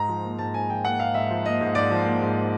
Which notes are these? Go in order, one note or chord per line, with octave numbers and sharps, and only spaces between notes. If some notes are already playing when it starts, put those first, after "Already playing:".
Already playing: G#2 A#5
F3
A#3
G#2 A5
G#2 G#5
F3 G5
A#3 F#5
G#2 F5
G#2 E5
F3
A#3 D#5
G#2
G#2 D5
F3
A#3
G#2